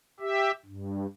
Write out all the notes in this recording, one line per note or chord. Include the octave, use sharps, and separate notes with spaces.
G4 E5
G2